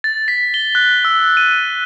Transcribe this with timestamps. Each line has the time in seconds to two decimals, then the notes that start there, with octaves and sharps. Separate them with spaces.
0.04 A6
0.28 B6
0.54 G7
0.75 F#6
1.05 E6
1.37 D#7